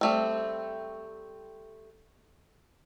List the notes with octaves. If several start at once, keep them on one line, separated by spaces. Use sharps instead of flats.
G3 A3 C4